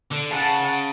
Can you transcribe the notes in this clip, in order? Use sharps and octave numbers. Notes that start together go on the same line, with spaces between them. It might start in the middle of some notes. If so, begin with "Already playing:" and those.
D3
C#3 F#5 A5